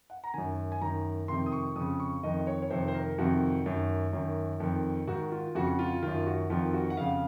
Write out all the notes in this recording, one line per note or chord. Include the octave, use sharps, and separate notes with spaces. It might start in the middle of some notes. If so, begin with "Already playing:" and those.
F#5
A#5
F#2 D#3 G#5
G#5
F#2 D#3 A#5
F2 C3 D#3 C6
D#6
C#6
F2 C#3 D#6
C#6
F2 D#3 D#5
D#5
C#5
C#5
F2 C3 D#3 C5
C5
A#4
F2 C3 D#3 F#4
F#2 D#3
F#2 D#3
F2 D#3
G#2 D#3 F#4
F4
F2 C#3 F#4
F4
F#2 D#3 F4
F#4
F2 D#3 F4
F#4
F#5
F2 C#3 F5